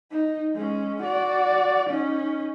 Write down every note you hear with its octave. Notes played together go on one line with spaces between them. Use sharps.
D#4
G#3 C#4
F#4 D5
C#4 D#4